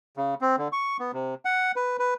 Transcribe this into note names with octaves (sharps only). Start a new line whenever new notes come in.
C#3
C4
D3
C#6
B3
C3
F#5
B4
B4